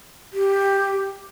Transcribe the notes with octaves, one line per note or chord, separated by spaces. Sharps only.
G4